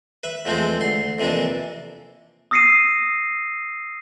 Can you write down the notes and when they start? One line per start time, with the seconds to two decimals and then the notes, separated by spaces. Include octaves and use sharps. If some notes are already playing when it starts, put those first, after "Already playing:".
0.23 B4 E5
0.45 E2 F3 G#3 A3 C4
0.80 D2 C6
1.18 F2 C3 E3 A#3 D4
2.51 D#6 E6 A#6 C7 C#7 D#7